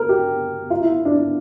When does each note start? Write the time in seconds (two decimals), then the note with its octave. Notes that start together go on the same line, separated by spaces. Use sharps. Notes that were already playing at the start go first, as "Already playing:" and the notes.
Already playing: A#4
0.09 G4
0.70 F4
0.82 E4
1.05 D4
1.17 D4